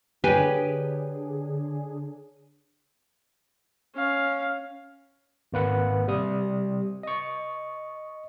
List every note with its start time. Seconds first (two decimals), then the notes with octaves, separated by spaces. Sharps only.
0.24 D3 D4 G4 G#4 B4 C#5 G#5
3.95 C#4 F5
5.53 G#1 A#3 B4 F#5
6.07 C3 G3 D#6
7.03 D#5 C#6